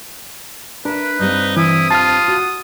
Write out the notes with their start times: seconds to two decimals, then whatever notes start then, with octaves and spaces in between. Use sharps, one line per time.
0.85 D4 A#4 B4 E5
1.19 G2 G3 C4 D#4
1.57 E3 E4 D#6
1.91 F4 A5 F6
2.28 F#4